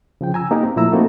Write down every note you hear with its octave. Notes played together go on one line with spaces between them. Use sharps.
C#3 F3 G5
G#5 A#5 E6
A#3 D#4 G4 A#4
C4
A#2 F3 A3 E4 A#5 E6
A3 A#3 C4 D#4 F#4 A4